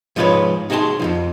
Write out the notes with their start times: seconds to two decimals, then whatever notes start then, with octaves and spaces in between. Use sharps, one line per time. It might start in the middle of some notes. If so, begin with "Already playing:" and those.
0.16 G#2 F3 G#3 F4 B4 C#5
0.70 D#4 F#4 G#4 G5 A5 C6
1.00 F2 G#2 F3